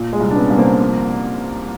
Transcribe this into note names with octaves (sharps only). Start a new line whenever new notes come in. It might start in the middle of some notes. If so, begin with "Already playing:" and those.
Already playing: A#2
G#3
C2
D4
B3 C#4
C2
A#3 C4
F3